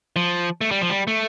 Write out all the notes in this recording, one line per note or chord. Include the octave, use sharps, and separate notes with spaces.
F3
A3
G3
F3
G3
A3